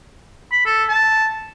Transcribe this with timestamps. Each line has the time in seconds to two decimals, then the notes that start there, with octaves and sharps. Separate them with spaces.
0.52 B5
0.66 A4
0.89 A5